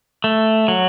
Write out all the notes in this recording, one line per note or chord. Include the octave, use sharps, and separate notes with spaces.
A3
F#3